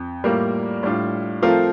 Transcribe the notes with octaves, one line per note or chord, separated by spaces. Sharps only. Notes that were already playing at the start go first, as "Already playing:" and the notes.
Already playing: F2
A2 G3 A#3 F4 A#4
A2 G3 D4 F4
F3 A3 C4 F4 A#4